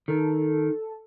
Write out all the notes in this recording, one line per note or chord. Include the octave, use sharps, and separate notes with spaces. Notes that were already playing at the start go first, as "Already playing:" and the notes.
D#3 A4